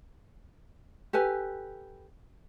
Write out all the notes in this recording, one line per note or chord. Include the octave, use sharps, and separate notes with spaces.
G4 A4 B4 G#5